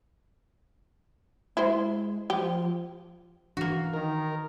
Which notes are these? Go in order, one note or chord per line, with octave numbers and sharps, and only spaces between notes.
G#3 E4 C5
F3 G4
E3 A#3 D4 F#4
D#3 A#4